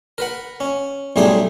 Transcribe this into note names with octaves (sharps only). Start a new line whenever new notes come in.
A#4 B4 F#5
C#4
B1 A2 G3 A3 G#4 C6